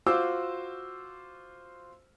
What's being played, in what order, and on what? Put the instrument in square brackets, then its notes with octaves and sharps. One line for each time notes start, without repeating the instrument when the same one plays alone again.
[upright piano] F4 F#4 C5 D6 E6